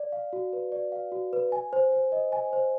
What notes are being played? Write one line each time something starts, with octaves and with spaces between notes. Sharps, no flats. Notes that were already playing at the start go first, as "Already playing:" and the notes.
Already playing: D5
F5
F#4
B4
D5
F5
F#4
B4
G#5
C5
C5
D#5
G#5
C5